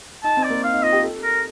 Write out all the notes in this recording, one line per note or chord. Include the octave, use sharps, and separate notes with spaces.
D#4 A5
C4
D5
A#3
D#4 F5
D#4
F4 D#5
G4
A4
A#4